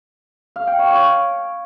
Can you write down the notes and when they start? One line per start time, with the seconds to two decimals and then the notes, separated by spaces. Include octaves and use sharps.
0.56 F5
0.67 G5
0.79 C#5
0.90 C#5